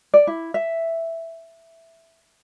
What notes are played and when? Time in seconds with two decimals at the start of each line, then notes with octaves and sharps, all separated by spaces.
0.14 D5
0.27 E4
0.54 E5